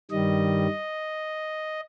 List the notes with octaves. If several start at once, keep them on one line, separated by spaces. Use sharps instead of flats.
G2 D#3 G3 D#5